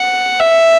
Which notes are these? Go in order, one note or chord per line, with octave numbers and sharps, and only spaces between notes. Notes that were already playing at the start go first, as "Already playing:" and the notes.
Already playing: F#5
E5